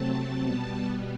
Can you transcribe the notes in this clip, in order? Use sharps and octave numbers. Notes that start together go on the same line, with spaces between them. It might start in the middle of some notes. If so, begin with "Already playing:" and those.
Already playing: C3 F#3 A3 C4 A5
B2 G3 B3